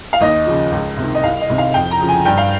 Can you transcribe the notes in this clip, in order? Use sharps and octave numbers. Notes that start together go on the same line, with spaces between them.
F5
D#2 D#5
C#3 F3
C#2
C3 D#3
D#5
C2 F5
D#5
C3 D#3
F5
F2 G5
A#5
C#3 F3
G#5
G2 G5
F5